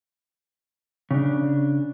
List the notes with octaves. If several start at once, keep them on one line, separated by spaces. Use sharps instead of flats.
C#3 D4